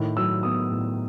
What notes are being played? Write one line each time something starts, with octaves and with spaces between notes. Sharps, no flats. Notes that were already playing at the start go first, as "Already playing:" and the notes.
Already playing: A2 D#3
F#3 E6
B3 D#6
A2